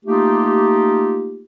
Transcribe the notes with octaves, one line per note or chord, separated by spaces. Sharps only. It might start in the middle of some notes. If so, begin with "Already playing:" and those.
A3 A#3 D#4 F4 G4